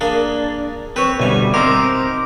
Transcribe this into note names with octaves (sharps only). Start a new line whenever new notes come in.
A#3 D4 G#4
C4 B4 C#5
D2 B2 G3 G#5
C4 D#4 A#4 C5 D6